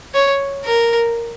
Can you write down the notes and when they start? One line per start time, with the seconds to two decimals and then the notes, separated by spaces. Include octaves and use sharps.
0.14 C#5
0.65 A#4